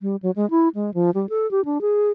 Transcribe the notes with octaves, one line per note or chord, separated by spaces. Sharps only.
G3
F#3
G#3
E4
G#3
F3
G3
A4
G4
D4
G#4